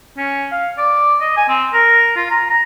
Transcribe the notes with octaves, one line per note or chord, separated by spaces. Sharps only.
C#4
F5
D5
D#5
G#5
C4
A#4
F4
A#5
A#5